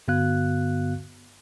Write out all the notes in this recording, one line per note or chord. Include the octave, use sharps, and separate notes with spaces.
G2 D3 B3 F#4 F5 F#6